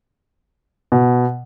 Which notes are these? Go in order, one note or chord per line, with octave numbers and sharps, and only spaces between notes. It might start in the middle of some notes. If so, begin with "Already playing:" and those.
B2